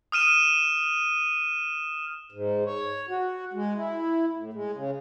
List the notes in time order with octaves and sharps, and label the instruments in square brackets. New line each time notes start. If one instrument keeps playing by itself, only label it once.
[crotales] D#6 F6 D#7 E7
[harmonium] G#2
C#5
F#4
G#3
E4
A2
G#3
C#3